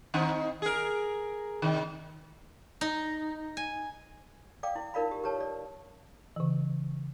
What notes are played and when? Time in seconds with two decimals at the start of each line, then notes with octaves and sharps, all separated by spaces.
0.14 D#3 C4 D#4
0.62 G#4 A#4
1.62 C3 D#3
2.81 D#4
3.57 G#5
4.63 D5 F5 G5 D6
4.76 E4
4.94 D#4 F4 A#4 D5 F5 B5
5.11 G4
5.24 G4 B4 C#5 A5
5.40 D5
6.36 C#3 E3